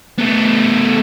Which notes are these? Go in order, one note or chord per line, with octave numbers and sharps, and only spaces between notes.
A3 B3